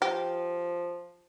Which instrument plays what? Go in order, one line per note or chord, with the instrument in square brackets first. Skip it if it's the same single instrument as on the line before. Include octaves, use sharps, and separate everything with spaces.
[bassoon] F3 [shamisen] G4